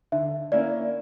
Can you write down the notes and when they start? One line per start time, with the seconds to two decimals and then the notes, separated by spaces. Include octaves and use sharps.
0.12 D3 E5
0.52 A#3 C#4 E4 D5